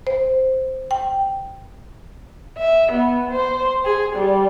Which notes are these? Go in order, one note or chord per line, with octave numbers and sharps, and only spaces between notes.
C5
G5
E5
B3
C5
G#4
G3